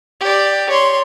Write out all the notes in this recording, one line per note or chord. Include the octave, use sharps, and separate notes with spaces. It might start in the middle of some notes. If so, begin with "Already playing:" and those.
G4 D5
C#5 C6